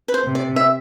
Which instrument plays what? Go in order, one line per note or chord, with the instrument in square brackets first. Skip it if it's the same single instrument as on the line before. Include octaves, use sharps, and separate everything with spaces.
[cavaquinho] B4
C5
[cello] C3
[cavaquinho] D5
E5